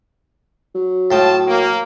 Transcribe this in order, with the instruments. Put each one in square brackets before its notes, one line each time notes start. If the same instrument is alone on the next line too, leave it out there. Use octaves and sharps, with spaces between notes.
[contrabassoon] F#3
[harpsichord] A2 G5 D#6 [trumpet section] F4 A5
[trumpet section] A#3